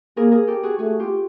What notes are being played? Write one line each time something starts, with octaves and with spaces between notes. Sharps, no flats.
A#3 G#4 A#4
G#4 A#4
G4 A4
F#4 G#4
A3 F#4 G#4
F4 G4